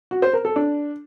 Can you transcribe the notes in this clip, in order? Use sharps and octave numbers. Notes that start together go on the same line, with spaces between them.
F#4
C5
A#4
A4
D4